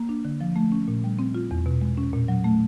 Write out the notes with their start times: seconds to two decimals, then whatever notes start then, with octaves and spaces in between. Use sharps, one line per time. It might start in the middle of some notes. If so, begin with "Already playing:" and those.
Already playing: A#3
0.09 D4
0.25 D3
0.41 F3
0.56 A3
0.72 C#4
0.88 A#2
1.04 G3
1.19 C4
1.35 F4
1.51 E2
1.66 B2
1.81 G#3
1.97 C#4
2.14 A#2
2.28 F#3
2.44 A3